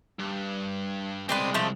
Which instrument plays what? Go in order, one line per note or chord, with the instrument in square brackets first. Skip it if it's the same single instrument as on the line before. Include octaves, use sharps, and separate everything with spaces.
[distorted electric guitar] G2
[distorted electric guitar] C2 G#3 [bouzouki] C4 D4 B4
[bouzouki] F3 A3